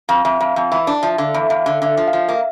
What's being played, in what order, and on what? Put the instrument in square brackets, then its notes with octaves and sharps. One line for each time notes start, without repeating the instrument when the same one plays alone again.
[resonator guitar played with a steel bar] F2 [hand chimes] F5
[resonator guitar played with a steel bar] F2 [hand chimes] E5
[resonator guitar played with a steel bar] F2 [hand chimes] F5
[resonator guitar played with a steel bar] F2
[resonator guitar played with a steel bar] E3 [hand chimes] E5
[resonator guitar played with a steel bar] D4
[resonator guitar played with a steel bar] F3 [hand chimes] E5
[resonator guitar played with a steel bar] D3 [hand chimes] F5
[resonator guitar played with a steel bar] E2 [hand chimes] E5
[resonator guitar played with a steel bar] E2 [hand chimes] F5
[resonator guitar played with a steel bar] D3 [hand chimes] E5
[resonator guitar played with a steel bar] D3 [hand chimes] E5
[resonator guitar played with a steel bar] F3
[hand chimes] F5
[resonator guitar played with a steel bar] F3
[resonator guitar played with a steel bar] A#3 [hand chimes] E5